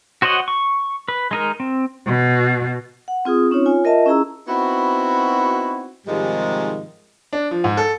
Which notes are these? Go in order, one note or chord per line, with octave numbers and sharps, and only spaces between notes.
F#4 C5 C#5 D#5 F#5
C#6
B4
G#3 D#4 A#4
C4
B2
F#5
C4 F4 G#4 D#6
C4 C#4 D#4 F4 C#5
F4 C#5 G#5
F4 A#4 D#5 E5 A5
C#4 E4 G#4 A#5 E6
B3 C4 D#4 E4 F#4
G#2 C3 D#3 F3 G3 G#3
D4
F3
G#2
A4